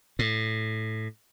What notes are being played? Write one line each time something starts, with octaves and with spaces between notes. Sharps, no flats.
A2